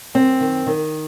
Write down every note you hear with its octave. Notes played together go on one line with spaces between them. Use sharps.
F#2 C4
D#3
D#3